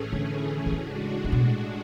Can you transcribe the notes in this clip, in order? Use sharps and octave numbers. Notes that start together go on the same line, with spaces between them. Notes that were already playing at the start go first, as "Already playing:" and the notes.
Already playing: A2 E3 A3 C#4 G#4
D3
B2
A2 C#3 G#3 D4 F#4
C#3
B2